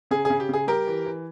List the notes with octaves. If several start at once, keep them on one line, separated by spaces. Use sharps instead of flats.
C#3 G#4
C#3 G#4
G4
C#3 G#4
G3 G4 A#4
E3
E3